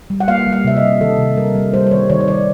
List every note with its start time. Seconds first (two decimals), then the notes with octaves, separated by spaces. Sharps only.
0.10 G3
0.20 F#5
0.28 A#3 F5
0.47 G3
0.53 F5
0.64 C3 E5
0.77 D#5
0.83 G3
1.01 D#3 A4
1.19 C3
1.37 G3 A#4
1.55 G3
1.73 G3 C5
1.87 C5
1.91 D#3 C#5
2.10 D#3 C#5
2.20 C#5
2.28 G3 D5